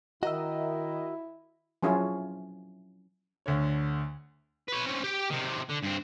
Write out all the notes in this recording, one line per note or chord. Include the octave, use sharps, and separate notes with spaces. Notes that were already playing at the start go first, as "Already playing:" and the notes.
D#3 E4 F#4 A#4 D#5 E5
F3 F#3 C#4 E4 F4 G#4
D2 D3 C#5
B4 C#5
C4 C#4
G4 G5
C3 D#3
D3
G2 C4